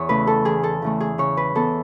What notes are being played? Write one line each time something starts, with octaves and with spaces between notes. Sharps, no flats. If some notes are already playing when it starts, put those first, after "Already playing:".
Already playing: E2 C#5
C#3 E3 A3 B4
A4
E2 G#4
A4
C#3 E3 A3
G#4
C#3 C#5
B4
E3 B3 E4 A4